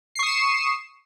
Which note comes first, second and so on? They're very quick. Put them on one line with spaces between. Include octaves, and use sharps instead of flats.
C7 C#6 D#6 E7 C#7